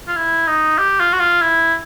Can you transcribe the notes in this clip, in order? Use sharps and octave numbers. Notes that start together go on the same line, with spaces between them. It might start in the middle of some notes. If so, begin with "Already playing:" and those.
F4
E4
D#4
G4
F4
F#4
F4
E4